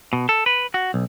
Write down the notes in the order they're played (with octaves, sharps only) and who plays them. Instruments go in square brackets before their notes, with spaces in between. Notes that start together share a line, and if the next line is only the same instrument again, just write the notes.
[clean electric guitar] B2
A4
B4
F#4
B1